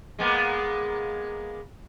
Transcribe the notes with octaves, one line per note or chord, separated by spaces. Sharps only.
G#3 A#3 B3